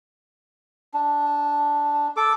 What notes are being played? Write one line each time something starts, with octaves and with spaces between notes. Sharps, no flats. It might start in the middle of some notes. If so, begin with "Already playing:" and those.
D4
A4 D6